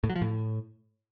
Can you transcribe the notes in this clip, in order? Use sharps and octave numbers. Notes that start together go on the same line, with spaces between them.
A2
F#3
F3
A2